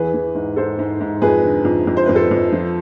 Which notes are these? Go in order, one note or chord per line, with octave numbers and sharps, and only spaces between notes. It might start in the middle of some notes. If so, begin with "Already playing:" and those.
Already playing: E2 E3 G#4 B4
E3
G#2
G#2 A4 C5
G#2
G#2
F2 G#4 B4
D3
F2
F2
C5
F2 B4
A4 C5
F2
F3